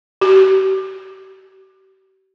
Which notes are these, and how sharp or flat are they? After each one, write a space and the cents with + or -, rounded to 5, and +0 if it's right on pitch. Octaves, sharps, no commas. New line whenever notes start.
G4 -45